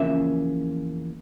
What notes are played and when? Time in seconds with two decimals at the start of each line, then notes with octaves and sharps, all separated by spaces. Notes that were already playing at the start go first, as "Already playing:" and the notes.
Already playing: E2 C#3 F3 A#3 C#4 E5